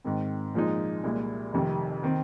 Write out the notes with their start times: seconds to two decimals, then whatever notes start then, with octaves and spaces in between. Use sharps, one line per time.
0.04 G#2 D#3 C4
0.54 A#2 F3 G#3 D#4
1.03 C2 A#2 G#3
1.53 F1 F2 C3 D#3
2.03 D#3 C4